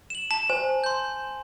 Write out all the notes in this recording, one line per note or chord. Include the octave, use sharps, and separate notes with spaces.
E7 F#7
A5
C5 G#5
C6 G6